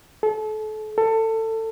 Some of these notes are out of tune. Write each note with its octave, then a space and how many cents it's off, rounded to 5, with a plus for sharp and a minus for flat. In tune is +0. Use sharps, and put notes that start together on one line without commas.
A4 -35
A4 +20